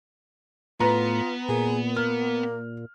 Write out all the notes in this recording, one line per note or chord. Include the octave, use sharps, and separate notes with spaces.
A2 B3 F4 B4 A#5
A#2 G#4
A#3 F6